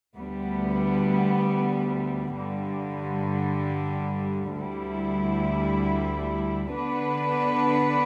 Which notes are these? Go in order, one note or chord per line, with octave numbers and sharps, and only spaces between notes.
D2 D3 G3 B3
G2 D3 G3
D2 D3 G3 E4
D3 B3 D4 B4